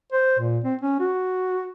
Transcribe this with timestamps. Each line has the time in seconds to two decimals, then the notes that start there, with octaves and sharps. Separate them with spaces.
0.12 C5
0.39 A#2
0.64 C4
0.81 C#4
1.00 F#4